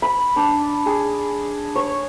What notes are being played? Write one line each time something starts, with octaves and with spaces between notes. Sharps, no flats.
B5
D4
G#4
C#5